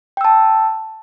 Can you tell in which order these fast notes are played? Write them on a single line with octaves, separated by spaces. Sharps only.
G5 E6 A5